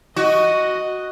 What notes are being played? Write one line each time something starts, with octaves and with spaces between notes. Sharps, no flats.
F#4 D#5